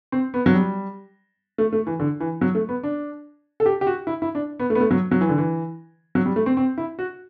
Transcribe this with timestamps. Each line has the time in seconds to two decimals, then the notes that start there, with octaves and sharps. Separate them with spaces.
0.12 C4
0.34 B3
0.46 F#3
0.54 G3
1.58 A3
1.73 A3
1.87 E3
2.00 D3
2.20 E3
2.41 F#3
2.55 A3
2.69 B3
2.83 D4
3.60 A4
3.66 G4
3.81 G4
3.87 F#4
4.07 E4
4.22 E4
4.35 D4
4.60 B3
4.70 A3
4.75 B3
4.81 A3
4.91 F#3
5.11 F#3
5.21 E3
5.29 D3
5.38 E3
6.15 F#3
6.26 G3
6.36 A3
6.46 C4
6.57 C4
6.78 E4
6.99 F#4